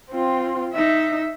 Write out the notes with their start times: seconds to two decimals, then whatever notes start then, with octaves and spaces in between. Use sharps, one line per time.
0.11 C4 F4
0.74 D#4 E5